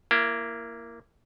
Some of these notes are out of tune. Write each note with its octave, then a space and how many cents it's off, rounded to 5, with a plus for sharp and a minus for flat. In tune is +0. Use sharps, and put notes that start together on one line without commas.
A#3 +0 E4 +30